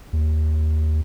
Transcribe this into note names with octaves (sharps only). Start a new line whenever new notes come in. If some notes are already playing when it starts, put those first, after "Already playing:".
D#2